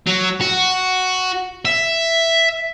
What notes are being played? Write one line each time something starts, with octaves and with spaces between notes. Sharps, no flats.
F#3
F#4
E5